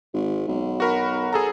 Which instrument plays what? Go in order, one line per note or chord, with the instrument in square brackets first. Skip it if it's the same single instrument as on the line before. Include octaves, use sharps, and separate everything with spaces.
[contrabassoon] G#1
B1
[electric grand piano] F#4 A#4 B5
G#4 A4 A#5